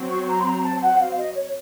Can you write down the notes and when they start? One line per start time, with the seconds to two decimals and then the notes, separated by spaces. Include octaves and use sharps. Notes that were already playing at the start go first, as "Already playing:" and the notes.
Already playing: F#3 C4 F#4 C5
0.10 C#6
0.28 A#5
0.40 C6
0.46 A#5
0.63 A5
0.82 F#5
1.00 F5
1.17 D#5
1.34 C#5